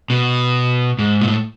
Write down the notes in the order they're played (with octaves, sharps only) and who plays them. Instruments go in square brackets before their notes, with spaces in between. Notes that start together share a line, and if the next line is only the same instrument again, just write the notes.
[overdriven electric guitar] B2
G#2
A#2
A2